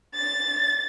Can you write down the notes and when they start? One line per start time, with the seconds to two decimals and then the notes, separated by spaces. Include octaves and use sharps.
0.16 A6